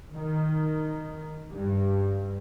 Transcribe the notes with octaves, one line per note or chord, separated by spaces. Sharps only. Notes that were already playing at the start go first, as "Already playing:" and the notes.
D#3
G2